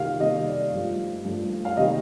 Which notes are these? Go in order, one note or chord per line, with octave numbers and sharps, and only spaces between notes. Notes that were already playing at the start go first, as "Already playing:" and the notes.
Already playing: C3 D#3 G3 A#3 F5
C3 D#3 G3 A#3 D#5
D5
G2 F3 A3
G2 F3 A3
F5
C3 D#3 G3 A#3 D#5